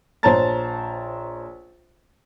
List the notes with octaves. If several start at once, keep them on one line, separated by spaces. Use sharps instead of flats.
A#1 C5 C#5 A5 A#5 A6